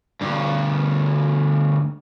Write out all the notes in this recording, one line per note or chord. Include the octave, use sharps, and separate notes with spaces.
D2 G2